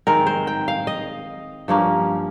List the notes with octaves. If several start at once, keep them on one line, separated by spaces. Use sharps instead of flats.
D#3 G#3 C4 A#4
C5
G5
F5
D#5
G2 F3 A#3 C#4